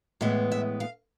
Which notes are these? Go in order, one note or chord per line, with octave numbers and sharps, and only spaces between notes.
A2 E3 G#3 B3 E5
E5
F5